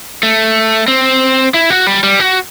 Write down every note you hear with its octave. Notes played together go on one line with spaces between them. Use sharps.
A3
C4
E4
F#4
G3
G3
F#4